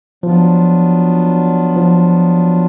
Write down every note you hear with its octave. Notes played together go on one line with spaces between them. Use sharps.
F3 F#3 B3 D4 F4
F3